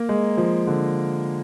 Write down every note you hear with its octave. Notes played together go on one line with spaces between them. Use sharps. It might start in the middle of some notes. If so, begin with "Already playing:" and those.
Already playing: A#3
G#3
F3
D3